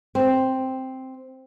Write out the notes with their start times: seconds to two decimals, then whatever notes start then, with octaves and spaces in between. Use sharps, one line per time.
0.15 C4